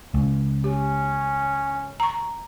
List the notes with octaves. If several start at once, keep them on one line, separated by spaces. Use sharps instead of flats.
C#2
C#4 G4
A#5 C#6